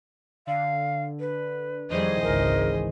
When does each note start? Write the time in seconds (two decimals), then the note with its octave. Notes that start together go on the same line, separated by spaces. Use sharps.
0.47 D3 F5
1.20 B4
1.90 F2 D#3 E3 G3 G#4 C5 D#5
2.23 G#1 C#2 A#4